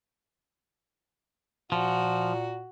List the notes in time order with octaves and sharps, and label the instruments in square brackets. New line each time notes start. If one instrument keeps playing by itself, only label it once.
[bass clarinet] A#2 [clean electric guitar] F3 [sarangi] F#4